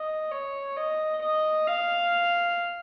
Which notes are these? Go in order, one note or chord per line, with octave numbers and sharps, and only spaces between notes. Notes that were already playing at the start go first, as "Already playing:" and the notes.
Already playing: D#5
C#5
D#5
D#5
F5